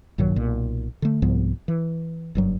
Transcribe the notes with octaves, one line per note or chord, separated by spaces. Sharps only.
A#1 G2 D#3 F#3
B1 A#2
D3 A3
C2 G#2 F3 B3
E3
F#1 G2 F#3